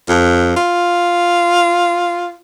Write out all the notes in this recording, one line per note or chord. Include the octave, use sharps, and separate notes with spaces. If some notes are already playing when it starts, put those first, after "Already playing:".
F2
F4